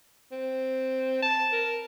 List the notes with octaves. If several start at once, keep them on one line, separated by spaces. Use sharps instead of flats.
C4
A5
A#4